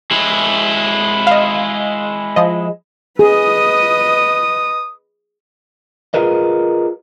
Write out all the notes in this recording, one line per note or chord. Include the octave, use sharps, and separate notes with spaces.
G#3 E4
D#5 F5
F3 D#5
G#4 B4 D#5 D#6
F4 G4 G#4 A#4 B4 D#5